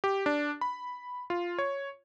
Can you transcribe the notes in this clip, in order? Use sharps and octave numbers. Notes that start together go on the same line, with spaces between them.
G4
D4
B5
F4
C#5